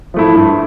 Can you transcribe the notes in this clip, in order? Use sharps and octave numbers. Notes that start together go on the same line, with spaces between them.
F3 A3 E4
G2